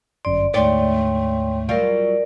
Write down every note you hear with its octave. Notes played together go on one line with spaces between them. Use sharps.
G1 F#2 D5 C6
D2 G#2 A3 C#5 D5 G5 C6
F#3 G3 F4 A#4 D5